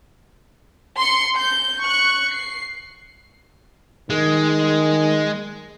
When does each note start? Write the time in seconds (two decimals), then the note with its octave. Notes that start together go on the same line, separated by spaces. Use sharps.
0.99 C6 C7 C#7
1.37 G6
1.81 C#6 F#6
2.33 C7
4.10 D#3 G#3